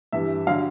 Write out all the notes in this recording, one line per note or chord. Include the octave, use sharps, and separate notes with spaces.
G2 E3 G3 E5
D3 F#3 F5